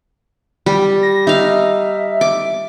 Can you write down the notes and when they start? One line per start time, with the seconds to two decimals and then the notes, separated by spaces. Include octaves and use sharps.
0.66 G3
1.03 A#6
1.27 D#4 E5 F5
2.21 D6